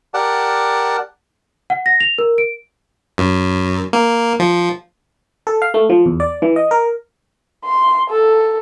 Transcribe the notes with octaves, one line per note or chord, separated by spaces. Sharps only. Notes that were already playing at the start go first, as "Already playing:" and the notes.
G4 A#4 D5 F#5 A5
F#5
A#6
F7
A#4
D7
F#2
A#3
F3
A4
F5
A3
F3
E2
D5
E3
D#5
A#4
C6
A4